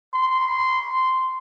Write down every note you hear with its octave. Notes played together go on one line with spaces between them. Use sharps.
C6